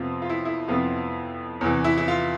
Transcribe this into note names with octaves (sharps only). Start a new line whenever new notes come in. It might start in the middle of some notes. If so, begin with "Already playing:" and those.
Already playing: F2 C3 F3 B3 F4
F4
E4
E4
F2 C3 F3 B3 F4
E2 C3 E3
E4
E4
F4